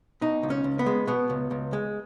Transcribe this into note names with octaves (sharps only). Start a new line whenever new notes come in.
B2 D#4
C#2
C#4
C#2
B3
G#3
B2 B3
C#2
C#2
G#3